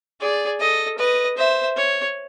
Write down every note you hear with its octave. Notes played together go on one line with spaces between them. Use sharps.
G#4 D5
A4 D#5
B4 D#5
C5 E5
C#5